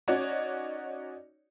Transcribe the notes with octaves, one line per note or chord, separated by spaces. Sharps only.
C#4 D#4 F#4 C#5 D5